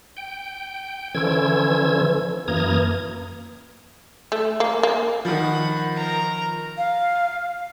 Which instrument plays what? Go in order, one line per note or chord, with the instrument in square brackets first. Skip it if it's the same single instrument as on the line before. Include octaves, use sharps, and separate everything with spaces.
[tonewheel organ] G5
D3 E3 F3 C#4 E6 G#6
F#2 E3 A#3 A#5 D#6 G#6
[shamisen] A3
A#3
A#3
[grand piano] D#3 F3 [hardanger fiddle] F#5 B5
[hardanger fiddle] A#4 A#5
[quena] F5